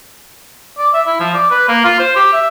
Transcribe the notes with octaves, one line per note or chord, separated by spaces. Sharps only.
D5
E5
E4
F3
D5
B4
A#3
F4
C5
G4
E5